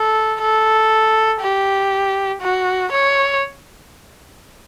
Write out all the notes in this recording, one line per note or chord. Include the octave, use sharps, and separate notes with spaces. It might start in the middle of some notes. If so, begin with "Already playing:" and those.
Already playing: A4
A4
G4
F#4
C#5